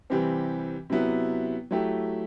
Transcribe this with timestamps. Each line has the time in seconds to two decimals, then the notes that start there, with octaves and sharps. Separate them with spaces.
0.10 C3 E3 G3 C4 G4
0.90 C3 F#3 B3 E4
1.71 F#3 A3 E4 G4